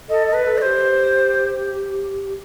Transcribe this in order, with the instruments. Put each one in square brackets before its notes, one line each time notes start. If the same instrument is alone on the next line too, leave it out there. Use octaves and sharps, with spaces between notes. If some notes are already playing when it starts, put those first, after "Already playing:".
[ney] A4 [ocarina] D#5
[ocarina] D#5
[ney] B4
[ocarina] A4
[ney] D#5
[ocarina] G4 [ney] C5